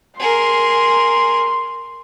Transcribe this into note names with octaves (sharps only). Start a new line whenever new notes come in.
G#4 A#4 C6